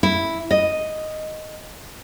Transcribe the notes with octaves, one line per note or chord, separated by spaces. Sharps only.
E4
D#5